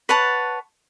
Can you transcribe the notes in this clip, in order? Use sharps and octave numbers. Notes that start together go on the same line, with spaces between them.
B4 C#5 F#5 A5